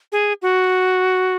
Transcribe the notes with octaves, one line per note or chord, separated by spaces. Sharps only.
G#4
F#4